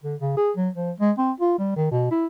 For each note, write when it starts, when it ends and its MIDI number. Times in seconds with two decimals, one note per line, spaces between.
0.04 0.16 50
0.20 0.33 49
0.37 0.52 68
0.57 0.69 54
0.75 0.91 53
1.00 1.12 56
1.18 1.32 60
1.40 1.56 65
1.59 1.71 55
1.76 1.89 51
1.91 2.11 47
2.11 2.26 64